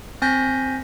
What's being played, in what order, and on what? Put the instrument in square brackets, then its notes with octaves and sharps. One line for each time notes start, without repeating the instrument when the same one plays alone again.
[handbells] C4 G#5 G6 A#6 B6